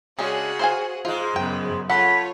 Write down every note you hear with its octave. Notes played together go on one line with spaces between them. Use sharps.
C#3 G#3 C#4 D4 F#4 G#4
C5 F5 G#5
G#2 G#3 F4
F#2 C#3 B3 G5
A3 F4 C#5 F#5 B5